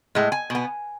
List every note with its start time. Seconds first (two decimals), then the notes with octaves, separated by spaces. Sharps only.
0.15 A2 G#3
0.32 G#5
0.50 B2 B3